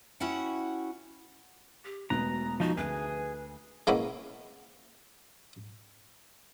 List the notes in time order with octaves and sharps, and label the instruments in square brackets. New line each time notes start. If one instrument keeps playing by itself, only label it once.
[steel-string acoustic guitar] C#4 E4 F#4 F#5 G5
[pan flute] G4
[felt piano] E1 B2 F#6 [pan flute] A3 [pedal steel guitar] A#5
[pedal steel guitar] F3 D#4 [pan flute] F#4
[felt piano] D2 [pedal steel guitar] G#4 [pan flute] B4
[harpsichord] G#3 A#3 B3 C#4 E4